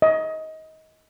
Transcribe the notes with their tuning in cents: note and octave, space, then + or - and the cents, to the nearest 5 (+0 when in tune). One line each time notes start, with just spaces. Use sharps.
D#5 +25